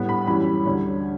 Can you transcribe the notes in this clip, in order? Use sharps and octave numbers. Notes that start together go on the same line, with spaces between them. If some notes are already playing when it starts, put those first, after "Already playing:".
Already playing: A2 G3 B3
B5
F#2 E3 G3 C#4 B5
D2 D3 G3 C#4